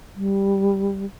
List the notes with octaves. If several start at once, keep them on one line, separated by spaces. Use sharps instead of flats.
G3